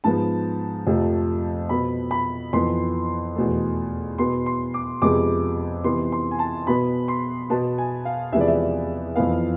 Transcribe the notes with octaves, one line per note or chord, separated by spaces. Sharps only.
G#2 F3 B3 A5
F2 C3 F3 A3
B2 B3 B5
B5
F2 E3 B3 C6
E2 B2 A3
B2 B3 C6
C6
D6
F2 C3 G#3 B3 D6
C3 E3 B3 C6
C6
G#5
A5
B2 B3 B5
C6
B2 B3 A5
G#5
F5
E2 C3 F3 G#3 B3 E5
D5
E5
D5
F2 E3 B3 F5